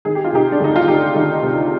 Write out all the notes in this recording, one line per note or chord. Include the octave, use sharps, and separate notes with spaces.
D#3 G#4
G4
F4
C3 D#4 G4
D4
D2 D#4
F4
D2 D#4 G4
D#3
C3